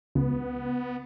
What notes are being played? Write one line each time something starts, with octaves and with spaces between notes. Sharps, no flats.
C#2 B3